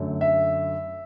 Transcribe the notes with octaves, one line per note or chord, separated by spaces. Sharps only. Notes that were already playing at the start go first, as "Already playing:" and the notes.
Already playing: F#2 D3 A3
E5